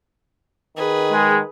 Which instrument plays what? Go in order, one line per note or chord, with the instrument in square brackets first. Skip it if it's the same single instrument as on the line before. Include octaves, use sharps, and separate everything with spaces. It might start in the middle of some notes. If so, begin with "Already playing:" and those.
[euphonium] D#3 [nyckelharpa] G#4 B4
[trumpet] G#3